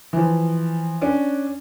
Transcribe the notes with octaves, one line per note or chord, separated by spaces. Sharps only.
E3 F3
C#4 D4